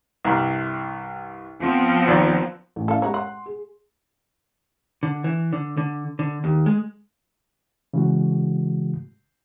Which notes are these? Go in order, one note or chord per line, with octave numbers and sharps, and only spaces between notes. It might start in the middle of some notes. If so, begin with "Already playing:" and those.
C2 G2
F3 B3 C4
D#2 D5 E6
A1
C#4 E4 A4 D5 F5
G#3 G4 C#5 F#5 A#5
F#5 C6
G#4
D3
E3
D3
D3
D3
D#2
G#3
C#3 E3 G#3 F#4